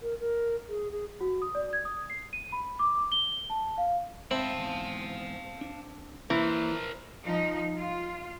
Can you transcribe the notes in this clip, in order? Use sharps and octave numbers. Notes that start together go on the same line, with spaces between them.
A#4
A#4
G#4
G#4
F#4
D#6
D5
G#6
D#6
C7
D#7
B5
D6
G7
A5
F5
G#2 C4 E5 F5 A5 B5
E2 G#2
D4
E3 A#3 A#4 C5
F3 D#4
F4